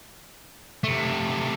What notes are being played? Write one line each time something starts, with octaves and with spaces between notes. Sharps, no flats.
C3 A3